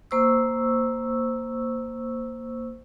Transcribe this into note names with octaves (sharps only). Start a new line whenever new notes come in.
A#3 C5 C#6 E6